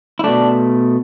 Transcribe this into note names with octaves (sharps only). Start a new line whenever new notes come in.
E4
B2 A3 D4